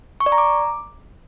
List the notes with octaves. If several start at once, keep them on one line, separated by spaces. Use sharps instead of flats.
C#6
D5
A#5
D6